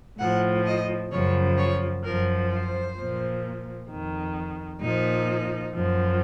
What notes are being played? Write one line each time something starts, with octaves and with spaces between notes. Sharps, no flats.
A2 F3 F#5
D#5
F#2 C#3 F3 C#5
C#5
F#2 F3 A#4
C5
A#2 F3
F2 D#3
A#2 F3 D#4
F#2 F3